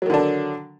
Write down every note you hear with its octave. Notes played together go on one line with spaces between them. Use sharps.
D3 D#3 F#3 D4